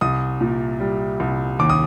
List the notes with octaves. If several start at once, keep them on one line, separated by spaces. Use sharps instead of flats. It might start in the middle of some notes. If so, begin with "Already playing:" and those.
C2 D#6
A#2
G3
C2
D#2 D6
D#6